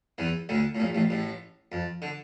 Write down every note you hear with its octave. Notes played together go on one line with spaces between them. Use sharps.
E2 E3
D2 D3
A2
A#1 A#2
A1 A2
A1 A2
F2
D3